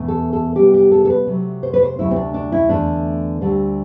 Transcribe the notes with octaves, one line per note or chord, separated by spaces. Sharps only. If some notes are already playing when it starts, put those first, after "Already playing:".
Already playing: E2 B2 A3
A4
A4
C3 G3 B3 G4
G4
A4
A4
B4
C3 F#3 A3 C4
C5
B4
C5
D2 C3 F#3 A3 C4 E4
C4
D4
D4
E4
E2 D3 A3 D4
D2 D3 G3 C4